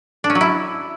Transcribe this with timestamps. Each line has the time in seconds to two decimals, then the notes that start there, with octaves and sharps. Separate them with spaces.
0.24 D4
0.30 C#4
0.35 F#3
0.41 E4